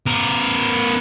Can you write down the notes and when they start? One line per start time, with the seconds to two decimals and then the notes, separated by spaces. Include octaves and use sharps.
0.06 B3 A#4